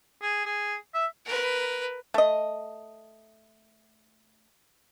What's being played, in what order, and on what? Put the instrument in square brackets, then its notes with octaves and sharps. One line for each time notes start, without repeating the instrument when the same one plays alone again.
[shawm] G#4
G#4
E5
[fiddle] A#4 B4
[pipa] A3 D#5